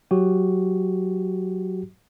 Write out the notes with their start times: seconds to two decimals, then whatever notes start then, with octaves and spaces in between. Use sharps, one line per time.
0.11 F#3 F#4 G4